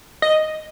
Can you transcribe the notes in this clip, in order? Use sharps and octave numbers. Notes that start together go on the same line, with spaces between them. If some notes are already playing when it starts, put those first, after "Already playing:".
D#5